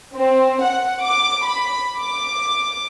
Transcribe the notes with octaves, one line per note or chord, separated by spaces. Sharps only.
C4
F#5
D6
B5
D6